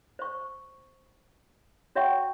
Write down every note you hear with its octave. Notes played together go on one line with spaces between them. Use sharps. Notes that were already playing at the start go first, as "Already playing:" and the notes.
C5 C#6
F#4 C#5 E5 F#5 G5 C#6